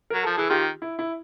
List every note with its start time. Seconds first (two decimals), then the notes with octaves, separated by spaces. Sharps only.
0.10 F#3 A#4
0.23 F3 A4
0.37 E3 G#4
0.49 D#3 F4 G4
0.82 E4
0.99 E4